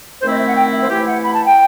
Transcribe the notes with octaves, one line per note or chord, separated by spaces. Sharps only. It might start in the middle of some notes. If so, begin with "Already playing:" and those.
D#3 A3 C4 E4 C5
D#5
E5
F#5
G5
E5
C5
E3 A3 E4 G4
F#5
B5
A5
G5